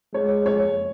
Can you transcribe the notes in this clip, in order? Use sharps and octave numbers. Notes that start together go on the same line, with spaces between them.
G#3 C#5
C#5